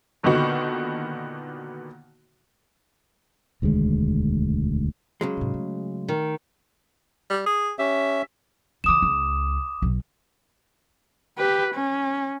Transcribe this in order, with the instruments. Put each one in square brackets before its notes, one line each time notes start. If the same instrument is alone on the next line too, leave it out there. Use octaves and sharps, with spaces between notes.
[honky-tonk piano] A#2 D3 D#3 B3 D#4 F#4
[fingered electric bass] E1 D2 D#3 G#3
[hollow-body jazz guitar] C#3 F#3 G#3
[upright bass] G#2 C3
A3
[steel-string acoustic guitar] D#3
[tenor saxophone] G3
G#4
[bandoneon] C#4 E5 [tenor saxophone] G4
[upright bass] C#3 E3 [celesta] D6 D#6 E7
[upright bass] C#2
B1 F#3
[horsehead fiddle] G4 B4
C#4